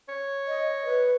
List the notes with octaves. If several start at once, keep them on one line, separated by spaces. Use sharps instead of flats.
C#5
D#5
B4